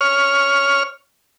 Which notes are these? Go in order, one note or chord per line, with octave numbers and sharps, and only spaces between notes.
C#5 F6